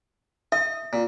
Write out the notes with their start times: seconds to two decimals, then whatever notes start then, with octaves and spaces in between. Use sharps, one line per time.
0.52 D#5 E5
0.93 A#2